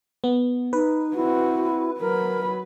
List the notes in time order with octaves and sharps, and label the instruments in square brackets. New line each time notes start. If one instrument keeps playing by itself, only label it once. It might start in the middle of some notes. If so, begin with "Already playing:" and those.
[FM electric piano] B3
[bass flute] D#4 [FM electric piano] B4
[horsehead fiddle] C4 F#4 [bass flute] E4
[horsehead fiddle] F#3 B5 [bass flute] A#4